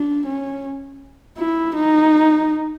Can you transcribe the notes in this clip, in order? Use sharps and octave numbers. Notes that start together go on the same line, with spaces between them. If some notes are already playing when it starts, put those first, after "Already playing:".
Already playing: D4
C#4
E4
D#4